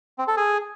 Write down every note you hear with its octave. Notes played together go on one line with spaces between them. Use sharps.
C4
A4
G#4